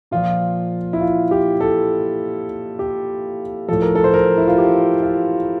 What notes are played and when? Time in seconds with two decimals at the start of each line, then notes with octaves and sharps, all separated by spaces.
0.11 A#2 F3 F4
0.93 E4
1.01 F4
1.31 G4
1.61 A4
2.79 G4
3.69 A2 F3 A4
3.82 A#4
3.95 A4
4.04 C5
4.14 A#4
4.37 E4
4.48 F4
4.58 G4
5.03 F4